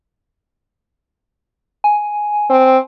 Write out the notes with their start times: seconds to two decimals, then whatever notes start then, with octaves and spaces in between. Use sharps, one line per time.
1.84 G#5
2.50 C4